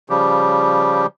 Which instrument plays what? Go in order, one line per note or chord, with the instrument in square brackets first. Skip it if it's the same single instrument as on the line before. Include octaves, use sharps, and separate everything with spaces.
[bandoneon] C#3 F3 G3 G4